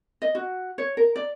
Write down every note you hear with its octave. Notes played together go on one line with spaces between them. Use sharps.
D#5
F#4
C#5
A#4
D5